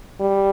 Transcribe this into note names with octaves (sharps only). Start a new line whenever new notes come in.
G3